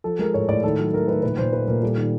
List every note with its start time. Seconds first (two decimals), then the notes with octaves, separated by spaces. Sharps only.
0.04 F3 A4
0.19 G#3 A#4
0.34 A2 C#5
0.49 A2 D5
0.64 D#3 A4
0.79 F#3
0.93 A3 A#4
1.08 D#3 B4
1.23 A#2 B4
1.38 A#2 C5
1.53 A3 B4
1.68 A#2 A#4
1.83 G3 A4
1.97 D#3